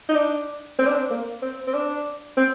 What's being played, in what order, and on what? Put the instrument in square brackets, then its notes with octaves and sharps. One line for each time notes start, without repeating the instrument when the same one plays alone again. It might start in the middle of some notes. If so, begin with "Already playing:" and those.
[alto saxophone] D#4
D4
C4
D4
C4
A#3
C4
C4
D4
C4